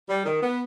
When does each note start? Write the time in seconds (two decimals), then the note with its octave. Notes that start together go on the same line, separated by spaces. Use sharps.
0.09 G3
0.26 D#3
0.42 B3